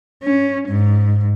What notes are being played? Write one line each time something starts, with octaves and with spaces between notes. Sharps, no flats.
C#4
G#2